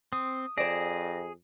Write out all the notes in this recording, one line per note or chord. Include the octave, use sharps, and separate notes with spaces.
C4 D#6
F2 G#4 C5 D5 A#6